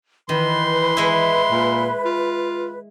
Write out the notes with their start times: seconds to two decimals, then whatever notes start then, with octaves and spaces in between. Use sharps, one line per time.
0.29 D#3 E3 B4 C6
0.97 G#3 E4
1.51 A#2
2.05 F4